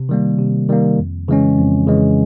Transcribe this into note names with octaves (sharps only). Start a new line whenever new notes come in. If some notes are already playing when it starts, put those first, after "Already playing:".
Already playing: C3
D#3 G3 A#3
C3
D#3 G3 A#3
F2
C#3 E3 G#3 C#4
F2
C#3 E3 G#3 C#4